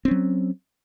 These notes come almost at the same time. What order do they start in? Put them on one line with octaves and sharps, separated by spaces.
C4 C#4 F#3